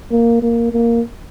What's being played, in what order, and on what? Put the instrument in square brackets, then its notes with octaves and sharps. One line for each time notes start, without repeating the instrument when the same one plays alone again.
[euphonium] A#3
A#3
A#3